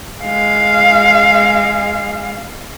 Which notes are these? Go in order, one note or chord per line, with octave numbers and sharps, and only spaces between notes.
G#3 F5